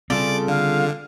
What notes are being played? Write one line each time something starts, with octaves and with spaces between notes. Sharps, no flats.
C#3 G3 A3 C4 F4 A4 D5 D6
D3 F5